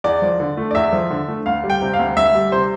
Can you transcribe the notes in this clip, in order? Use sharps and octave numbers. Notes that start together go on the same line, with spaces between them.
E2 D5
F3
D3
A3
D5
E2 E5
F3
D3
A3
D2 F5
G3
G5
C3
F5
D2
D2 E5
G3
C3 C5